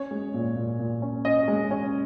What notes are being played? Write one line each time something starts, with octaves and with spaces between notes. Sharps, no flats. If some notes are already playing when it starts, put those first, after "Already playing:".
Already playing: C#4 C#5
G#3
A#2
A#2
A#2
C#4
C#4 D#5
G#3
C#4